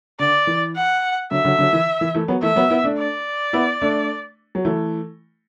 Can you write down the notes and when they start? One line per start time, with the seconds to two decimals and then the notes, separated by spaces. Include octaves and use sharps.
0.19 D3 D5
0.47 E3
0.75 F#5
1.31 D3 F#3 E5
1.45 D3 F#3
1.58 D3 F#3
1.73 E3
2.01 E3
2.14 E3 A3
2.28 F#3 B3
2.42 E3 A3 E5
2.56 F#3 B3
2.70 B3 E4
2.84 A3 D4
2.98 D5
3.53 B3 E4
3.82 A3 D4
4.55 F#3
4.65 E3 A3